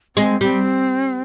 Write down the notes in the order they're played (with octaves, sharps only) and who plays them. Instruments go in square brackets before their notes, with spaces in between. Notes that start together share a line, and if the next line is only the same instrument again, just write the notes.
[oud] G#3 [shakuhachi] C4
[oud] G3 [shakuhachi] C4